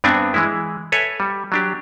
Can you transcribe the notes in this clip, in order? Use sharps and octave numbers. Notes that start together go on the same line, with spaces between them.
G2 B3 C4 D4 G#5
E3 G#3 E4
A4 B4 C#5 E5 G#5
G3
F#3 D4 G4